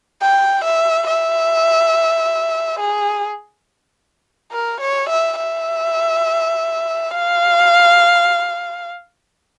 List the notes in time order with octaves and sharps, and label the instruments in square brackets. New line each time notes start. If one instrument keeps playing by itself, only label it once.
[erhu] G5
E5
E5
G#4
A#4
C#5
E5
E5
F5